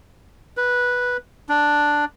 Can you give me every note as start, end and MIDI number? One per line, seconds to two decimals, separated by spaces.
0.57 1.17 71
1.49 2.05 62